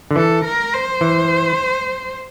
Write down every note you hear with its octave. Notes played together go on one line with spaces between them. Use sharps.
D3
E3 A4
A#4
C5
E3